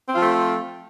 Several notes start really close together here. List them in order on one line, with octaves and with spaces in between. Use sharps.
C4 F4 F3 A3